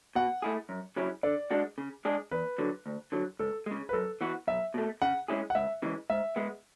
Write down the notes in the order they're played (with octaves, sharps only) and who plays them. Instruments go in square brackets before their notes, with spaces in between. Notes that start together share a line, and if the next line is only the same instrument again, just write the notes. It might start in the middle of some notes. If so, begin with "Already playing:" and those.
[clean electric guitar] B2 [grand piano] F#5
[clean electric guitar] A3 E4 G#4
F#2
C#3 F#3 C#4 E4
[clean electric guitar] D3 [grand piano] D5
[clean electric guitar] G#3 D4 F#4
C#3
G#3 D4 G#4
[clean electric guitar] E2 [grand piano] B4
[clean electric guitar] D3 F#3
D2
D3 F#3
[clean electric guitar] C#2 [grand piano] A4
[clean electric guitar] C#3 G#3
[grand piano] B4
[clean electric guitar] F#2 [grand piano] A4
[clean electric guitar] E3 B3 F#4
[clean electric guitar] B1 [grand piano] E5
[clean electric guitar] B2 A3
[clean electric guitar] C#3 [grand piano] F#5
[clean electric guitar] G#3 C#4 E4 G#4
[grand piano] F#5
[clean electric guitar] C#2 [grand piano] E5
[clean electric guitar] C#3 E3 G#3
[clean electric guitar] G#2 [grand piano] E5
[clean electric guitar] G#3 B3